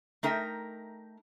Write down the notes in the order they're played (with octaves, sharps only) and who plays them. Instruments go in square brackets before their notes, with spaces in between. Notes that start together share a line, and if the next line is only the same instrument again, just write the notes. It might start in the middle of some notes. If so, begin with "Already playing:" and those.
[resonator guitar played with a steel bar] A3 D#4 A#4 E5 G5